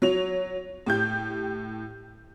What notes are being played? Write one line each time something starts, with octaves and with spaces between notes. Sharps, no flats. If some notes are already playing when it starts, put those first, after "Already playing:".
F#3 C#5 F7
A2 G4 G6